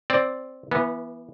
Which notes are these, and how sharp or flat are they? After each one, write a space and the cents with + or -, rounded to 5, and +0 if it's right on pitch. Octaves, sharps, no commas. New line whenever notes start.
C4 +0 D5 +0
E3 +10 B3 -25